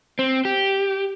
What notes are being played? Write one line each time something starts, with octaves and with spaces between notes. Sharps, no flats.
C4
G4